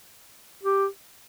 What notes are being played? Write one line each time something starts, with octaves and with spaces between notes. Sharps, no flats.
G4